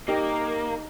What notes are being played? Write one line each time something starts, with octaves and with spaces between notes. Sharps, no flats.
A#3 D#4 G4 A#4